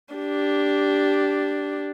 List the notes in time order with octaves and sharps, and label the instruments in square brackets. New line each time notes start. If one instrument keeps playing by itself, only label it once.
[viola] D4 G4